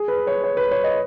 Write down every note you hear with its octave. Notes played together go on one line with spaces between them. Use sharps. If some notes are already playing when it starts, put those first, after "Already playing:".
Already playing: G#4
B4
C#5
C#5
B4
C#5
D#5